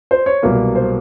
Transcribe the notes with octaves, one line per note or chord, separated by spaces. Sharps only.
C5
C#5
C2 B2 F#3 A#3 B4
C5